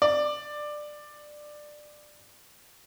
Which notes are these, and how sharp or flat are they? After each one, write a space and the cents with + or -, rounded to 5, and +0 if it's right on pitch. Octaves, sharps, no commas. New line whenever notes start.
D5 +15